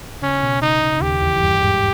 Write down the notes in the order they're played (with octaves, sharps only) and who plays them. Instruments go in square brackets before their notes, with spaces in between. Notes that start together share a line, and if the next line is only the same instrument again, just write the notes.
[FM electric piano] C#3 [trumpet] C#4
[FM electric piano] B2
[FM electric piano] C#3 [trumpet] D#4
[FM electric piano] C#3
C#3
[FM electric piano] D#2 D#3 [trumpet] G4
[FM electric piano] E2 E3
E3
G2 G3
G3
G#2 G#3